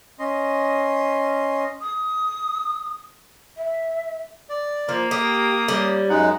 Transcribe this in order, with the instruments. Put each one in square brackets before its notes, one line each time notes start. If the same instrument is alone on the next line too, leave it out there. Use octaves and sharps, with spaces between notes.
[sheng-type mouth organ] C#4 D#5 C6
[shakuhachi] D#6
E5
[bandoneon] D5
[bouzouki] F3 [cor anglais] A#3
[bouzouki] G4 [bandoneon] D#6
[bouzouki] G3 C#4
[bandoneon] F#2 G#3 D#4 [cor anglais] F#5